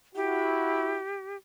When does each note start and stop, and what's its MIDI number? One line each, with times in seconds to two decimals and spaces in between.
0.15 0.99 64
0.15 0.99 66
0.15 1.37 67